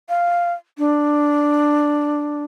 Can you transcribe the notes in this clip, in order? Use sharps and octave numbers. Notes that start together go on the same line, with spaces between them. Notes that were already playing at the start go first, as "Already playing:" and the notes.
F5
D4